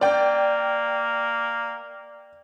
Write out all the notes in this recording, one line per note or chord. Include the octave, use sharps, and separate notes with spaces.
A#3 D5 G5